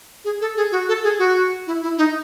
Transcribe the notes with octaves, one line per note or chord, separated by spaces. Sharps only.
G#4
A4
G#4
F#4
A4
G#4
F#4
E4
E4
D#4